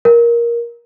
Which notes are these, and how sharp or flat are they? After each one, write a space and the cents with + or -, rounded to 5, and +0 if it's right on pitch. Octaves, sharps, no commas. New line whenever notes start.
A#4 +10